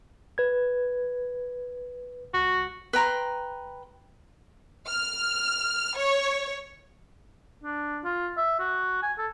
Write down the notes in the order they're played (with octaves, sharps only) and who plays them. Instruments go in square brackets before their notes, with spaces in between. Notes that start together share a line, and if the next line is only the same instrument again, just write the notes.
[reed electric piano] B4 G#6
[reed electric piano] C#2 [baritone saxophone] F#4
[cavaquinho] B4 G5 A#5 C6
[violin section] F6
C#5
[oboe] D4
F4
E5
F#4
G#5
A4